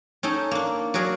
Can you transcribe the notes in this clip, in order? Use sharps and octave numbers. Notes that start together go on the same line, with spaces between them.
C#4 D#4 A4 G5
A#3 D4
F#3 F#4 G#4 A#4 C#5 D5